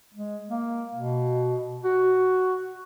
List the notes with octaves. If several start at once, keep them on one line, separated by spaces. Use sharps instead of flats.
G#3
A#3
B2
F#4